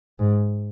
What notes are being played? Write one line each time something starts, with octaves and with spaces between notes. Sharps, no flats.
G#2